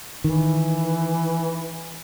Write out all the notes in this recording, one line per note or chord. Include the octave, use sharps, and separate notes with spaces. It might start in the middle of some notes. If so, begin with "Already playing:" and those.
D#3 E3